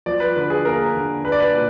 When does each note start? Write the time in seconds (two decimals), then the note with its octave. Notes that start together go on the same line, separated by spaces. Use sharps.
0.06 F3 D5
0.20 B4
0.36 D3 B4
0.50 G#4
0.65 A#3 A#4
0.95 D3
1.24 D4 B4
1.32 D5
1.40 B4
1.54 A#2